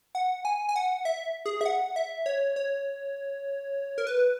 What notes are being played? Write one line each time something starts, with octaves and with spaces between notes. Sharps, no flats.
F#5
G#5
G#5
F#5
E5
G#4
E5
F#5
E5
C#5
C#5
A#4
B4